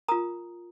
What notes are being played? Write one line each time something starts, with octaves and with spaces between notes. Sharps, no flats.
F4 A#4 A#5 D#6